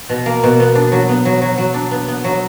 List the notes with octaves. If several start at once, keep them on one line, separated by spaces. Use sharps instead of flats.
B2
A#3
B2
B3
D4
F#3
B3
F#3
F#3
F#3
D4
B3
B3
F#3